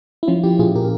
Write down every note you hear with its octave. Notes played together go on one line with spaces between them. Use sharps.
E4
F3 C#4 F4
F3 E4 G4
A#2 F4 G#4
A#2 G4 A#4